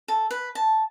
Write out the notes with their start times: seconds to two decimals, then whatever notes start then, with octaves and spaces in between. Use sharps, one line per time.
0.08 A4
0.31 B4
0.55 A5